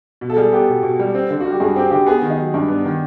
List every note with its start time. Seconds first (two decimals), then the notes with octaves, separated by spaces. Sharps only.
0.21 B2
0.30 A4
0.37 G3 G#4
0.52 B3 G4
0.69 B2
0.83 B2
0.99 G3
1.15 C4
1.30 D3
1.40 F#4
1.46 G3 G4
1.60 G2 G#4
1.76 C4 G4
1.91 D3 G4
2.07 B3 G#4
2.22 D#3
2.30 D#4
2.39 F#3
2.54 G2 D4
2.68 B3
2.85 D#3